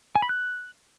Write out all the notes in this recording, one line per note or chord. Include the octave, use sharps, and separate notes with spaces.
G#5
B5
F#6